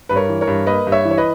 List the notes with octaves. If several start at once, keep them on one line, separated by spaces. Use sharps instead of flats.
G2 B4
A#4 C#5
E3
A#4 C#5
G2
A#3 B4 D#5
G2
C#5 E5
E3
C#5
B4 D#5